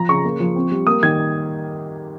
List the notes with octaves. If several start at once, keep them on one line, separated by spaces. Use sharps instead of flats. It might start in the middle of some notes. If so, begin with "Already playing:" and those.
Already playing: F3 A#5
C#3 C#6
A#3
F3
C4
G3
A#3 D#6
D#3 G#6